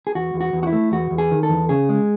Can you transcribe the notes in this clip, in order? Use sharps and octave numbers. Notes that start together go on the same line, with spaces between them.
G#4
E2 F#4
E2
F#4
E2
F#4
E4
A3
E2 F#4
E2
G#4
D#3
A4
E2
C#3 G#4
G#3